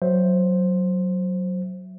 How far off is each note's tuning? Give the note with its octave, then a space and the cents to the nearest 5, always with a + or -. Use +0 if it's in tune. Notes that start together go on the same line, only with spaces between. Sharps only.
F#3 +0 C5 +0 E5 +0